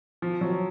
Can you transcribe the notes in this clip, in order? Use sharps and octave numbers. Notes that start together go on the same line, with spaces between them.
F3
F#3